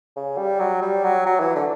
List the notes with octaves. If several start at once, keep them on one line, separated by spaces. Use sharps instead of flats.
C#3
G3
F#3
G3
F#3
F#3
E3
D3